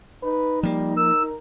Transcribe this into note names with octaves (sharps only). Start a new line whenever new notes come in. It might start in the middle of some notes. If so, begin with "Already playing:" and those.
D#4 B4
F3 G3 A#3
A#4 E6